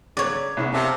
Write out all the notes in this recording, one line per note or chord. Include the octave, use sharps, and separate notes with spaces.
C#3 F#3 C#5 D5
C2 C#3 B3 C#4
C3 G4 A#4 F5 A5